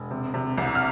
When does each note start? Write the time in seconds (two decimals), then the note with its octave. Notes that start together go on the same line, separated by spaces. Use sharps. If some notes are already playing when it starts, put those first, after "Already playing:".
Already playing: E1
0.11 C3
0.34 C3
0.58 C2
0.75 F6